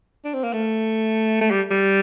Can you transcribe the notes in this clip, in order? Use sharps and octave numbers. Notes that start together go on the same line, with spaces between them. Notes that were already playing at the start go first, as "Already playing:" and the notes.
D4
C4
A#3
A3
A3
G3
G3